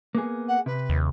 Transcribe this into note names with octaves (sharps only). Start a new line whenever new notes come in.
A#3 B3 G#4
F#5
C3 B4
D#2